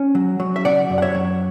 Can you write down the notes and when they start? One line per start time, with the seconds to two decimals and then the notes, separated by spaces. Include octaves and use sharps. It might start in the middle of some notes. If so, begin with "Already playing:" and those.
Already playing: C#4
0.15 F#3
0.40 F#3
0.56 E5
0.65 C#3 D5 F#5
0.90 F#2
0.98 F#5
1.02 C#5 E5
1.15 F#3